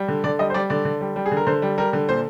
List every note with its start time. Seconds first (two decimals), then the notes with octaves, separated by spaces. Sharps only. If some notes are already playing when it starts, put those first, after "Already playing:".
Already playing: G3
0.08 D3
0.24 D3 D5
0.39 G3 D#5
0.50 C5
0.54 G3 D5
0.70 D3 D5
0.85 D3
1.01 G3
1.16 G3
1.26 G#4
1.32 D3
1.37 A#4
1.47 D3 C5
1.62 G3
1.78 G3 A#4
1.93 D3
2.08 A#2 C5